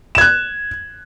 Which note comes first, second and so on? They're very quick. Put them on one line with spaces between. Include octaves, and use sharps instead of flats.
E7 G#6 F#6